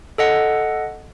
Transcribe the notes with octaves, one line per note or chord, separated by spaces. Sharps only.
A4 D#5 F#5